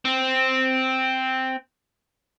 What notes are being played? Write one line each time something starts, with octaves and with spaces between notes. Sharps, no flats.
C4